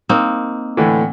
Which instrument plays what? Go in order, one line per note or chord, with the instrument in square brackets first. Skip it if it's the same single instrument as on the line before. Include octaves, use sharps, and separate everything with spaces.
[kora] A#3 C4 D#4
[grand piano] A2 D3 E3